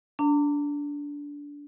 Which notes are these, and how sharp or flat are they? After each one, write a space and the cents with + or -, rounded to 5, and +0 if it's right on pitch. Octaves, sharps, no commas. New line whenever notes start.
D4 -20 A#5 -40